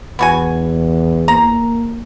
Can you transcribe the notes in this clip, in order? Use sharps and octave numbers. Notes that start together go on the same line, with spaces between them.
E2 B3 F#4 G#5
A#3 A#5